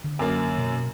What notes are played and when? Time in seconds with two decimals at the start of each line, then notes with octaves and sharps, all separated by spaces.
0.04 D3
0.19 F#2 A#3
0.58 B2